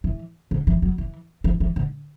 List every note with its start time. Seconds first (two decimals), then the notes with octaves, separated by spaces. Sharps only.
0.04 E3
0.51 D3
0.67 E3
0.82 F#3
0.98 E3
1.44 E3
1.60 E3
1.76 D3